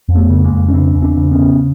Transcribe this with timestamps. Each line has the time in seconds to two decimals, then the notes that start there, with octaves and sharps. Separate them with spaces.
0.09 F2
0.15 A3 B3
0.29 C#3
0.44 G#3 A#3
0.52 F2
0.69 C#4
0.73 C#3 C4 D4
0.95 E2
1.02 C4 D4
1.17 C#3
1.31 B3 C#4
1.39 C#3